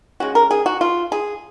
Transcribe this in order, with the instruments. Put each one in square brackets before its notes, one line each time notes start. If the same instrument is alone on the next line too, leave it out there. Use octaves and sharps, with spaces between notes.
[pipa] C#3 G#3 C#4 F#4
A#4
G#4
F#4
F4
G#4